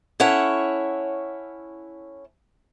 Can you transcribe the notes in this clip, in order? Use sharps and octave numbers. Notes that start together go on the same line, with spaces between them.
C#4 E4 A4 C#5 F#5